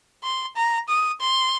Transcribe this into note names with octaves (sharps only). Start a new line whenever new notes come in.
C6
A#5
D#6
C6